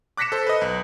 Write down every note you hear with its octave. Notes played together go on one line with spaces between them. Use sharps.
D6 F#6 A#6 B6 C#7 E7
A4 C5
B4 D#5
B1